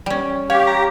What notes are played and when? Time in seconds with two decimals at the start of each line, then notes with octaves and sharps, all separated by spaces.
0.06 G3 C#4
0.50 G4 C#5 F5
0.67 A#5